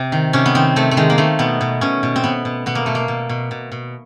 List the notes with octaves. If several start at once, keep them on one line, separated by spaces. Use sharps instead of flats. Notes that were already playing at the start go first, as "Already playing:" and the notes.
Already playing: C3
D#3
C3 C#4
B3
D#3 C4
C3 A3
A3
D#3 G#3
A#3
D#3 A3
B2 B3
B2
B2 C#4
B2
C4
B2 B3
B2
B2 B3
A#3
B2 A3
A#3
B2
B2
B2
B2